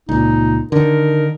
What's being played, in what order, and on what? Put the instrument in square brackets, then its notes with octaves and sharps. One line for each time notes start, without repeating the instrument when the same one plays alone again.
[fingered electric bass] C#2 A#2 [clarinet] D#4
[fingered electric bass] D3 D#3 [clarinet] A#4